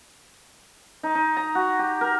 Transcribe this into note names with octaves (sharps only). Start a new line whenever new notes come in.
D#4
D#4
A#5
F#4
G4
A#4